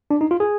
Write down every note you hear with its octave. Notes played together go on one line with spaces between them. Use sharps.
D4
D#4
F4
G#4